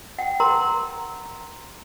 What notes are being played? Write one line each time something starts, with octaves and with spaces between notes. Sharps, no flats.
F#5 G5
A#4 A#5 C6 D#6